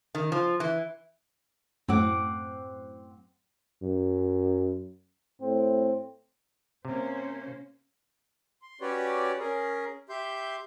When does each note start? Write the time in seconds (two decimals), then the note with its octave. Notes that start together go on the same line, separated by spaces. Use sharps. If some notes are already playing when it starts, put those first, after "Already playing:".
0.15 D#3
0.32 F3
0.60 E3
1.88 F#2 A2 C4 F#5 D6
3.82 F#2
5.41 A2 C4
6.85 C3 A#3 C#4 C5
8.62 C6
8.81 C#4 F#4 G4 B4 C#5 D5
9.39 C#4 G#4 A#4
10.09 G4 E5 C6 G6